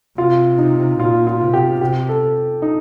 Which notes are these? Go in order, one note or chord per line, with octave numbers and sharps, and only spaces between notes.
C3 F4
D#4
A#2 F4
F4
C3
G4
C3 G4
A4
D#4